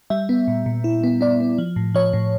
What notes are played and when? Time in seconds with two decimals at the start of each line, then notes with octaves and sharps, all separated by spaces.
0.10 G3 E5
0.29 B3
0.48 A#2
0.66 A#2
0.84 E4
1.04 B3
1.21 B3 D5
1.40 B3
1.58 F3
1.76 A2
1.95 F3 C#5
2.13 A2